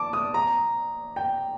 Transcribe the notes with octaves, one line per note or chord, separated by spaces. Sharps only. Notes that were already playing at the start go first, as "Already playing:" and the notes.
Already playing: A5 D6
D#6
A#5
G5